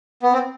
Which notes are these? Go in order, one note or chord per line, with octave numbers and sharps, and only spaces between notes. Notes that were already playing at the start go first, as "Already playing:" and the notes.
B3
C4